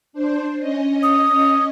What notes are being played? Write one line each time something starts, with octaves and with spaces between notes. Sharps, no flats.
D4 C5
C#4 D#5
D#6